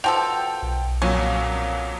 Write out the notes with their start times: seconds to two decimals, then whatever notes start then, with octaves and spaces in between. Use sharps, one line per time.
0.04 B2 F3 A4 G5 F7
0.62 B1
1.02 F2 A#2 F#3 C#4